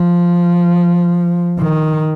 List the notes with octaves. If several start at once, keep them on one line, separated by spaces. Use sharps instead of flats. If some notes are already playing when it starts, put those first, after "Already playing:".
Already playing: F3
D#3